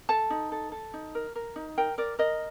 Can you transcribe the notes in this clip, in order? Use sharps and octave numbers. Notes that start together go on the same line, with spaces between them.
A4 A5
D#4
A4
A4
D#4
A#4
A#4
D#4
A#4 G5
A#4 D5
A#4 D#5